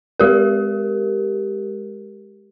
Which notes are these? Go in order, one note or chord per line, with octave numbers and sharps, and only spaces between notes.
G#3 G4 A#4